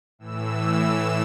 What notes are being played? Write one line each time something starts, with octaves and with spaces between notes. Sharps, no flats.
A2 E3 E6